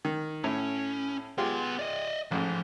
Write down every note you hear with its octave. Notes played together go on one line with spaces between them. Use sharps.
D#3
A2 C#4
G#3 B3 F4 G4 C6
D5 D#5
A1 G#2 F3